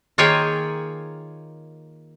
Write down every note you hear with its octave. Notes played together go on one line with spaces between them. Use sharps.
D#3 A#3 F4 G#4 C#5 G5